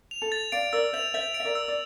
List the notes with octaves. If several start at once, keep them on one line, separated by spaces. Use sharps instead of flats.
F7
A4
A6
D5 F5 D7
A#4 D5 E6
C5 E5 F7
C5 E5 A6
D7
E5
A#4 D5
E6
D5